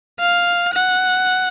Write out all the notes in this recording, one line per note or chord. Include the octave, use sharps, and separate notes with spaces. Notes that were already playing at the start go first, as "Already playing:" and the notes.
F5
F#5